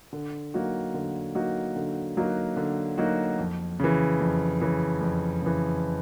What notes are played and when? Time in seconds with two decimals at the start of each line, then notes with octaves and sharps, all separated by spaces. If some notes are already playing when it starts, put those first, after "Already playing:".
0.13 D3
0.54 F#3 A#3 D#4 F#4
0.94 D3
1.35 F#3 A#3 D#4 F#4
1.76 D3
2.17 F#3 A#3 D#4 F#4
2.57 D3
2.98 F#3 A#3 D#4 F#4
3.38 F2
3.79 C#3 E3
4.20 F2
4.61 C#3 E3
5.01 F2
5.42 C#3 E3